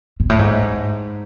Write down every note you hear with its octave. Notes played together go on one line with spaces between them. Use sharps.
G#2
A2
G#2